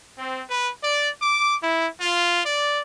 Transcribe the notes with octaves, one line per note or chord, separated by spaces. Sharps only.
C4
B4
D5
D6
E4
F4
D5